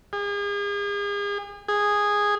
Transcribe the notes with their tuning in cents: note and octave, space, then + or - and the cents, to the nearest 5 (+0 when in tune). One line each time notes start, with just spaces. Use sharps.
G#4 -40
G#4 -10